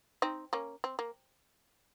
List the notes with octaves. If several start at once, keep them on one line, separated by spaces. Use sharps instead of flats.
C4 D#4
A#3 C#4
C4
A#3